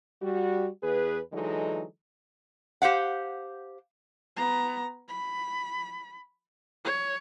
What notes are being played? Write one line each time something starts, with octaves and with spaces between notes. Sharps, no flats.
G3 F#4
E2 G#4 B4
D3 E3 F#3 G#3 D#4 A4
G4 C5 F5 F#5
B3 A#5
B5
C#5